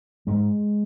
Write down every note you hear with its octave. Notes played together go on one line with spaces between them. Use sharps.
G#2 G#3